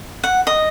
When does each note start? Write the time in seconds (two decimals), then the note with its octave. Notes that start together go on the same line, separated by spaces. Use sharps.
0.24 F#5
0.47 D#5